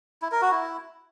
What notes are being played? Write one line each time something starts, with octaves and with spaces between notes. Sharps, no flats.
E4
A#4
F#4
E4